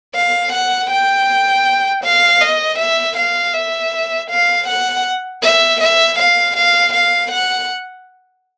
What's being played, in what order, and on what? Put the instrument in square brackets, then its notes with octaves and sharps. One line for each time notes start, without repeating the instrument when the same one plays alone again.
[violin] F5
F#5
G5
F5
D#5
E5
F5
E5
F5
F#5
E5
E5
F5
F5
F5
F#5